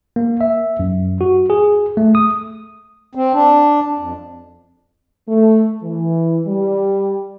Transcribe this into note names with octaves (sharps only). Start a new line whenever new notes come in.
A#3
E5
F#2
F#4
G#4
A3
D#6
C4
D4
F2
A3
E3
G3